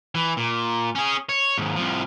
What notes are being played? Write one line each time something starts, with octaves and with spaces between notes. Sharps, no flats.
E3
A#2
C#4 G#4
C#5
D#2 G#2
C2 F3